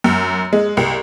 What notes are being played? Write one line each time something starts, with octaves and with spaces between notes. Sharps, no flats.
F#2
G#3
C2